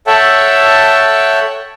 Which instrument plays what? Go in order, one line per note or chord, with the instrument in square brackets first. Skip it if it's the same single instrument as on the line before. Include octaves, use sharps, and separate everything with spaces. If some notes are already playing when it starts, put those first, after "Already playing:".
[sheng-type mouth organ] A4 C#5 E5 F#5 G5 A5